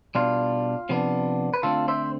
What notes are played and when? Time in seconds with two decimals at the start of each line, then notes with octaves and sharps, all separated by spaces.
0.15 B2 G3 D4 F4
0.89 C3 F3 B3 D4
1.54 B4
1.63 D3 A3 C4 F4 A4
1.88 C5 E5